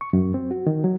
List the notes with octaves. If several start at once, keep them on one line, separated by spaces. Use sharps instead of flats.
C#6
F#2
C4
F#4
D#3
F#3